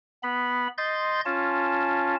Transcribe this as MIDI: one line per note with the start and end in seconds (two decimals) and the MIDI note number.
0.23 0.68 59
0.23 0.68 83
0.78 1.21 75
0.78 1.21 84
0.78 1.21 91
0.78 1.21 93
1.25 2.16 61
1.25 2.16 65
1.25 2.16 81